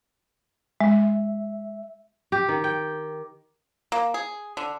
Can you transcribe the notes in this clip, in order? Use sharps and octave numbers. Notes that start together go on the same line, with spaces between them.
G#3 E5
G4
D#3
G5
A#3
G#4
D3